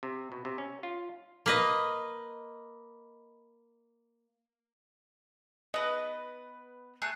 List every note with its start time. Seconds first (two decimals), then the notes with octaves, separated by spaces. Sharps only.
0.03 C3
0.32 B2
0.45 C3
0.58 C#4
0.83 F4
1.46 A#3 B4 D#5
5.74 B3 B4 D#5
7.02 A3 G#4 F#6